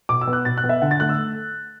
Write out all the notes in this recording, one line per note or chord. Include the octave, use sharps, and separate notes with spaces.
B2 D6
E6
B3
F#6
B2 A6
F#6
B3
E5
D3 F#5
A6
A3 F#6
E6